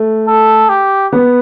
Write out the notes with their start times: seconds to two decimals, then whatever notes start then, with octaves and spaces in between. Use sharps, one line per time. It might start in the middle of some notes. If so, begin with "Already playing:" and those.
Already playing: A3
0.28 A4
0.69 G4
1.13 B3